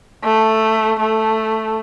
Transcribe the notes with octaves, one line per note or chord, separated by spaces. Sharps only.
A3
A3